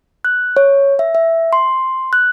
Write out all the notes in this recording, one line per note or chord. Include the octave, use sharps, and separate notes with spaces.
F#6
C#5
E5
E5
C6
F#6